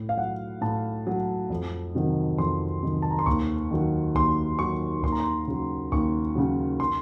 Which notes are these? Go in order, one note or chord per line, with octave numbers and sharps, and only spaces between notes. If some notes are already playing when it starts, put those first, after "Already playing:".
Already playing: A2
F5
F#3 F#5
A2 A5
F#3
F2
C3 D#3 F#3
F2 C6
C3 D#3 F#3
A5
A#5
C6
D#2 C#6
D#3 F#3
D#2 C6
D#3 F#3 C#6
D#2 C6
A#5
C6
C#3 F#3
D#2 C#6
C#3 F#3
C6